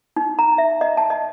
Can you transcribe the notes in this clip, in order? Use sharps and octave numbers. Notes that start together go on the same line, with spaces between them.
D#4
A#5
E5
D#5
A5
D#5